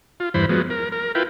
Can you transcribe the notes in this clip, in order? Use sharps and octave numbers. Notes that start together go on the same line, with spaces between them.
F4
E2 G2 E3 C5 B5
F3 F#3 G#3 B3
A#4
A#4
E4 F4 B4 G5